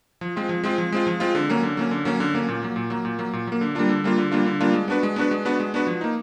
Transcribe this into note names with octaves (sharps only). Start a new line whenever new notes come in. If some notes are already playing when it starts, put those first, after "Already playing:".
F3
G#3 C4 F4
F3
G#3 C4 F4
F3
G#3 C4 F4
F3
G#3 C4 F4
D3
F#3 A#3 C#4
D3
F#3 A#3 C#4
D3
F#3 A#3 C#4
D3
F#3 A#3 C#4
A#2
F#3 A#3
A#2
F#3 A#3
A#2
F#3 A#3
A#2
F#3 A#3
D3
G3 A#3 D4 F4
D3
G3 A#3 D4 F4
D3
G3 A#3 D4 F4
D3
G3 A#3 D4 F4
G#3
B3 D4 F#4 B4
G#3
B3 D4 F#4 B4
G#3
B3 D4 F#4 B4
G#3
B3 D4 F#4 B4
F3
A#3 D#4